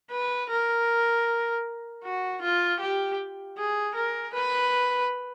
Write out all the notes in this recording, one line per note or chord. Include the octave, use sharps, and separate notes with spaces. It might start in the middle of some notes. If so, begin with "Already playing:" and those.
B4
A#4
F#4
F4
G4
G#4
A#4
B4